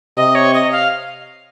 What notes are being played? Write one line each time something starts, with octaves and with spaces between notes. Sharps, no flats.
C3 D#5
C#5
D#5
F5